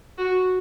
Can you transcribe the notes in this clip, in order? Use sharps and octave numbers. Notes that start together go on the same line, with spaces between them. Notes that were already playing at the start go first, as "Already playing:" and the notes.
F#4